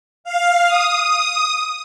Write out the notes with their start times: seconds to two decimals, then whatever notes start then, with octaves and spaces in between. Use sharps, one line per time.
0.24 F5
0.67 D#6